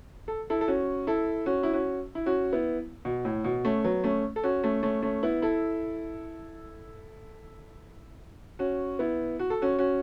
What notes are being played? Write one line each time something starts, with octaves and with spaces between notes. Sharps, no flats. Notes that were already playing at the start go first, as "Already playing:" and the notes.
A4
E4 A4
A4
C#4 F#4
E4 A4
C#4 F#4
E4
C#4 F#4
E4
C#4 F#4
B3 E4
B2
A2
B2
A3 C#4
F#3 B3
A3 C#4
A4
C#4 F#4
A3 C#4
A3 C#4
A3 C#4
B3 E4
E4 A4
C#4 F#4
B3 E4
F#4
A4
C#4 F#4
C#4 F#4